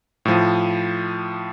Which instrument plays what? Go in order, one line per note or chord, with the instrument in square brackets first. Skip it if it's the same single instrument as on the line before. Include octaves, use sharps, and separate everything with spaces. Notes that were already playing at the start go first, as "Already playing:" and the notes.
[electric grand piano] A2 F3